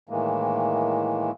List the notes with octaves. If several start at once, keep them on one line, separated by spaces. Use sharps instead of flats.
A2 D#3 E3 G#3 A#3